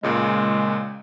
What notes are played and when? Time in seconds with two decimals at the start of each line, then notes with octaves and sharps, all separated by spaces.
0.03 C#2 A#2 C#3 G#3